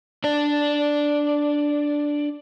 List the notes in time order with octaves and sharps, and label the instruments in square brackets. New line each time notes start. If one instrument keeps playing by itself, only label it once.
[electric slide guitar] D4 D5